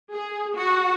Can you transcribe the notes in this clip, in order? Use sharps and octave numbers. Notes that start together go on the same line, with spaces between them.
G#4
F#4